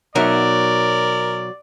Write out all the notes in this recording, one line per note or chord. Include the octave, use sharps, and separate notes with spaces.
B2 F#3 D#4 A#4 D5 E5